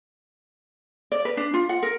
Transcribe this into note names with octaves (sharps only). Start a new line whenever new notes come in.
D5
B4
D4
F4
F#5
A#4